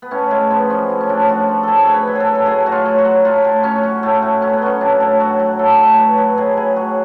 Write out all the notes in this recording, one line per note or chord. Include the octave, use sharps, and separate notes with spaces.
B3
A2 C#4
A2 G#3
F3 B3
F3 C#4
A2
C#4
A2 D4
F4
F3 F#4
F3
A2 G#4 A4
A2 C#5
B4
F#3
G#4 A4
F#3
A4
A2 G#4
A2 F#4
F4
F#3
F#4
F#3
A2 F4
A2
F#3 C#4
F#3
A2 A3
A2
F#3 C#4
B3
F#3 C#4
A2 D4
A2
F#3 F#4
F#3
A2 A4
A2 C#5
F#3 B4
F#3 B4
A2 G#4
A2 G#4
F#3 F#4